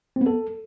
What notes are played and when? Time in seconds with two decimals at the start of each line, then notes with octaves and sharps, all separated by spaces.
0.16 C4
0.21 B3
0.26 A4